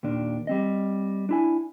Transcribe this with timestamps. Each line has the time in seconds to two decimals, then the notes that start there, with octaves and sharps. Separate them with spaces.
0.03 D#2 A#2 D#3 D4
0.47 G3 C4 D#5
1.29 D4 E4 G#5